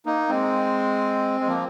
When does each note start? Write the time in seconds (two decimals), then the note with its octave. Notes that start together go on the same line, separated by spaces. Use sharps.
0.06 A#3 D#4
0.29 G#3 C4
1.41 G#3
1.47 F3 A#3